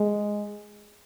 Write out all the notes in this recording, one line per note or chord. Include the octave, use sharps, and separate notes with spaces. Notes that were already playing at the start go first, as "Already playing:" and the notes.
Already playing: G#3